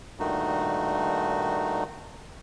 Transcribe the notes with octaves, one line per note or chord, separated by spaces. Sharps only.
G2 A#2 D#3 A3 D#4 F#4